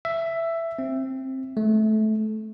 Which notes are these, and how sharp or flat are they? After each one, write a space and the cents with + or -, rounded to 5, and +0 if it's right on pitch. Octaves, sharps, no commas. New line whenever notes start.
E5 +10
C4 +15
A3 -20